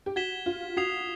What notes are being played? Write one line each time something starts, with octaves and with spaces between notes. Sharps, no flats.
G4
F#4 G#6 B6 E7 G7
F4
F#4 D#6 G#6 C7 F7